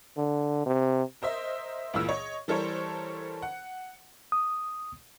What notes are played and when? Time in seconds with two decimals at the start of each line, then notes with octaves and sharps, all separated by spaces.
0.17 D3
0.66 C3
1.22 A#4 C5 D#5 E5
1.94 C#2 A#2 E3 E6
2.09 C#5 D#5
2.48 E3 G3 A4 A#4 C5 C#5
3.42 F#5
4.32 D#6